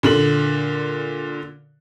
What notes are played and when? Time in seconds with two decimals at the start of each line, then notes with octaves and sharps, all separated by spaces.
0.03 A#2 D3 F#7